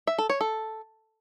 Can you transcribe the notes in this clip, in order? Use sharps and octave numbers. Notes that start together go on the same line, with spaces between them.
E5
A4
C#5
A4